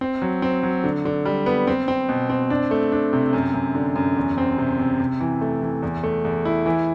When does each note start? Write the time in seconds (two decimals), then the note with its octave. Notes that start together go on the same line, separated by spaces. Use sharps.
0.01 C4
0.22 F#3
0.42 C4
0.63 F#3
0.84 D3
1.05 D3
1.25 G3
1.46 B3
1.67 C4
1.88 C4
2.09 B2
2.30 C4
2.50 D4
2.71 A3
2.92 D4
3.13 C3
3.33 F#2
3.54 F#2
3.75 D3
3.96 F#2
4.17 E2
4.38 C4
4.58 C3
4.79 C3
5.00 C3
5.20 E3
5.41 A3
5.62 E3
5.83 E2
6.04 A3
6.25 E2
6.45 E4
6.66 E3